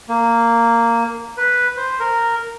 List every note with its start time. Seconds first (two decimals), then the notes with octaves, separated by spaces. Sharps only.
0.09 A#3
1.37 B4
1.77 C5
2.00 A#4